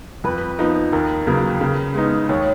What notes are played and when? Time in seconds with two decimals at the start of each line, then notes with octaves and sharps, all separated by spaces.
0.24 F2 B4
0.59 F3 B3 D#4 B4
0.93 D#2 A#4
1.27 C#3 F#3 A#3 B4
1.61 C#3
1.95 G#3 B3 D#4
2.29 D#2 C#5